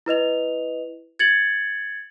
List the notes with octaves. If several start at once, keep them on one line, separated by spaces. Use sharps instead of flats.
E4 B4 D#5 F7
G#6 A6 C#7 F#7